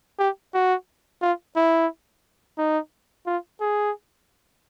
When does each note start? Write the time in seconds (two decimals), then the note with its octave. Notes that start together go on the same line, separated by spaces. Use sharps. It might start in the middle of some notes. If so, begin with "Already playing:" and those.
0.19 G4
0.54 F#4
1.22 F4
1.56 E4
2.58 D#4
3.27 F4
3.60 G#4